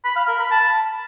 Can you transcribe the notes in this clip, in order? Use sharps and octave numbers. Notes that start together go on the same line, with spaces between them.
B5
F5
A#4
B5
A5